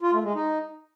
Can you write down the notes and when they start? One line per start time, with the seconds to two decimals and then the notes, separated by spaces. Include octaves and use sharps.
0.01 F4
0.12 A3
0.24 G#3
0.35 D#4